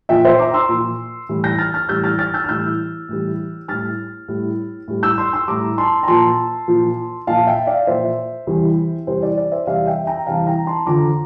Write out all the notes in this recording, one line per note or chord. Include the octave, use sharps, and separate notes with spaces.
A#2 F3 E5 G5
C5 E5
A#5 D6
C6 E6
A#2 F3
A2 E3 G3
G6 A#6
F6 A6
F6 A6
A2 E3 G3 E6 G6
F6 A6
F6 A6
E6 G6
F6
A2 E3 G3 E6 G6
A2 E3 G3
A2 G3 F6 A6
A2 G3
A2 G3
E6 G6
C6 E6
C6 E6
A2 G3 A#5 D6
A5 C6
A#5
A#2 F3 A5 C6
A#2 F3
A#2 F3 F5 A5
E5 G5
D5 F5
A#2 F3 C5 E5
E2 C3 E3 G3
E2 C3 E3 G3 C5
D5
D5
C5 E5
E2 C3 E3 G3 D5 F5
E5 G5
G5 A#5
E2 C3 E3 G3 F5 A5
G5 A#5
A5 C6
F2 D3 F3 A#5 D6